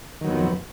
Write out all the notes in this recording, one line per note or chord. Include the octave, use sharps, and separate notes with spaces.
F2 D#3 F#3 B3